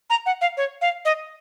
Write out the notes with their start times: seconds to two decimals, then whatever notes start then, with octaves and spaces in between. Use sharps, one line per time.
0.10 A#5
0.26 F#5
0.41 F5
0.57 C#5
0.81 F5
1.05 D#5